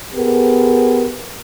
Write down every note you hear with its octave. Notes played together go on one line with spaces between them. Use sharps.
B3 G4 G#4 A#4